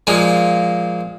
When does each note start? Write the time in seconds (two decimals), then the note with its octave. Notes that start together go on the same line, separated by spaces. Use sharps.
0.07 A#2 F3 G#3